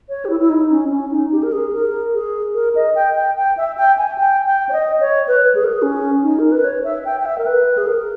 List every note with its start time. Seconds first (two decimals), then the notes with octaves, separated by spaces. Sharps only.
0.09 C#5
0.25 G4
0.30 E4
0.40 E4
0.49 D#4
0.70 C#4
0.91 C#4
1.11 D#4
1.32 G4
1.43 A#4
1.52 G#4
1.73 A#4
2.14 G#4
2.54 A#4
2.75 D#5
2.95 G5
3.16 G5
3.36 G5
3.57 E5
3.77 G5
3.98 G#5
4.18 G5
4.46 G5
4.69 C#5
4.73 D#5
5.00 C#5
5.28 B4
5.55 G#4
5.64 A#4
5.73 G#4
5.82 C#4
6.23 D#4
6.39 A#4
6.52 B4
6.64 C#5
6.84 E5
7.05 G5
7.20 G5
7.25 E5
7.38 A#4
7.46 B4
7.77 G#4
7.87 A#4